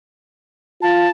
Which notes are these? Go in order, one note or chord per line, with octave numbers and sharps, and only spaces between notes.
F4 A5